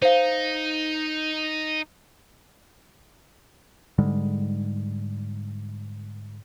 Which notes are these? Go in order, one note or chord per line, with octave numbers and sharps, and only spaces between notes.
D#4 C5 F5
G#2 D3 G3 G#3